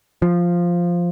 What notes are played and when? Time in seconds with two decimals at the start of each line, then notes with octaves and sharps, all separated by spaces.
0.22 F3